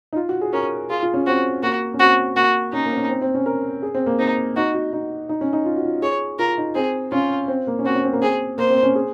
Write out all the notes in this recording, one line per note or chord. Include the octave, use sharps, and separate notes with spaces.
D#4
F4
F#4
G#4
C#4 A#4
F4 G#4
F4
C#4
C4 F#4
A#3 F#4
C#4
C4 F#4
A#3 F#4
C#4 D#4
A#3
C4
C#4
C4
C4
C#4
A#4
G#4
C4
A#3
C4 D#4
D#4 F#4
F#4
D#4
D#4
C#4
D#4
F4
F#4
F4
G#4 C#5
F4 A#4
D#4
C4 G#4
C#4 F4
C4
A#3
C#4
C4 F#4
C#4
C4
A#3
C4 G#4
A#3 C5
C4
C#4
G#4